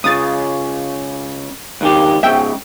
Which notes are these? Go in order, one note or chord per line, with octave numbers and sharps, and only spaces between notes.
C#2 C#3 D#6 A6
C#2 D#3 G4
G#2 C#3 E5 G5